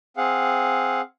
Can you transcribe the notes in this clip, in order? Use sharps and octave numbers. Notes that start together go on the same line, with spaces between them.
C4 G#4 F5 F#5